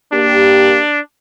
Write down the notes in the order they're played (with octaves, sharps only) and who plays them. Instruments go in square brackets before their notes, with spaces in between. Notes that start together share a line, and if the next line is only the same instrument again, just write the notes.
[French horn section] A#3 G4 [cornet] D4